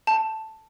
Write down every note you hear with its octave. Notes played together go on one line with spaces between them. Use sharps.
A5